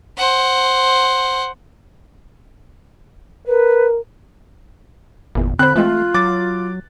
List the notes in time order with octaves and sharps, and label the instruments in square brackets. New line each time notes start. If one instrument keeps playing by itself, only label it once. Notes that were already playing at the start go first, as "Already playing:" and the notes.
[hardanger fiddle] C5 F#5
[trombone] A#4 [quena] B4
[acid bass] G1 [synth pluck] E2 A#2
[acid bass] D3 [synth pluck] C4 C5 [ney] B5 [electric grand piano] F#6
[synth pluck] E3 G#3 C4 [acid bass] A3 [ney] F4
[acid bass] F#3 [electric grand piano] D6 A6